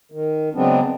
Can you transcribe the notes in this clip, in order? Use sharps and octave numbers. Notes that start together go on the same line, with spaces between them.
D#3
C#3 F#3 G#3 B3 C4 D4